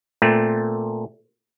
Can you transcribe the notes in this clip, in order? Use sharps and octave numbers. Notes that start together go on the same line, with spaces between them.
A#2 A3 C4